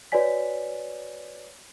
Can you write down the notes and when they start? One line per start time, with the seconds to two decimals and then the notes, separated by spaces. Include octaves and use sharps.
0.12 F#4 B4 C#5 D5 G#5 B6